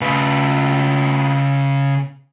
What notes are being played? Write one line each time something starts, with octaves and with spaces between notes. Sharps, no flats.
C#3 B4